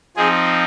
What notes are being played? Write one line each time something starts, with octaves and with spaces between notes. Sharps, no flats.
F3 C4 D#4 G#4